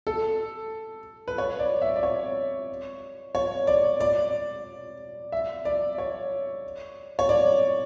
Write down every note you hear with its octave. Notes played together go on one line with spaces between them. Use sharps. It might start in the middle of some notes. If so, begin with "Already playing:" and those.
A4
B4
C#5
D5
E5
D5
C#5
C#5
D5
D5
E5
D5
C#5
C#5
D5